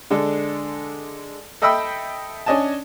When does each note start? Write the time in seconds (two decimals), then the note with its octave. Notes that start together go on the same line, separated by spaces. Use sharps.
0.10 D3 G#3 D4 A4
1.62 A4 D#5 E5 G5 B5 E6
2.46 C#4 D4 D#5 G#5 A5